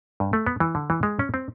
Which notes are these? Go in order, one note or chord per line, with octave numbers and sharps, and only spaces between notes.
G2
A3
B3
E3
D3
E3
G#3
C#4
C4